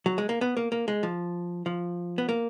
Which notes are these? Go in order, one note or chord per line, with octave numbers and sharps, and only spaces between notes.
F#3
G#3
A#3
B3
A#3
A#3
G#3
F3
F3
B3
A#3